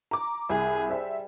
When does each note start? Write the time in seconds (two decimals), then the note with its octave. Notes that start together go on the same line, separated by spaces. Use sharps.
0.11 A#5 D6
0.50 C2 G#4
0.90 G3 C5 E5